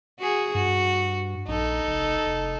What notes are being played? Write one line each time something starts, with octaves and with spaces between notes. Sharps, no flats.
F#4 G#4
G2 F#4
A#1 D#4 A4
F1
F1